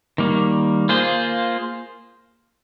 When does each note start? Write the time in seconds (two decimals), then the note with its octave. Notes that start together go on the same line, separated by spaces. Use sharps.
0.18 D#3 G3 A#3
0.89 A#3 F4 G#4 C5